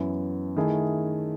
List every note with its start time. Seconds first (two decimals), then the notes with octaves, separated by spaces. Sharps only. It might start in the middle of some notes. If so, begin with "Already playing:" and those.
Already playing: F#2 E3 B3 E4
0.57 D#3 A3 E4 G#4